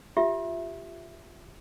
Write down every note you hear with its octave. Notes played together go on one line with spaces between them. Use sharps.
F4 G4 E5